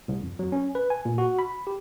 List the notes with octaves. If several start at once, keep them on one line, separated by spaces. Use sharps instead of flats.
C2
F2
F#3
C#4
B4
G#5
A#2
F#4
B5
G4